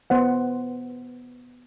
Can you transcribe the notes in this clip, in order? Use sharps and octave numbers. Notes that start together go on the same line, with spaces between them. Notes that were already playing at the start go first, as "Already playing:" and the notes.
B3 C5 F#5